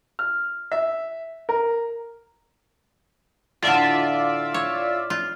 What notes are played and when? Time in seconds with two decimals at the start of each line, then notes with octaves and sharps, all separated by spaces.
0.19 F6
0.72 E5
1.49 A#4
3.62 A2 D3 F4 D5 E5
4.54 C#5
5.10 F4